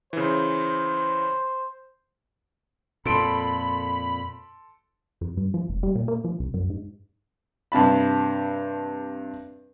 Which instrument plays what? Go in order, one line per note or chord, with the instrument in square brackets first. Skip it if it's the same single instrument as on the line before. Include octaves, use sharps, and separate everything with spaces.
[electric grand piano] C#3 E3 [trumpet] C5
[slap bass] F2 A#2 [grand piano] A4 C6 D7 [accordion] B5
[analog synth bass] F2
G2
F3
F1
G3
A#2
A#3
F3
C2
F#2
G#2
[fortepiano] G2 C3 A5 B5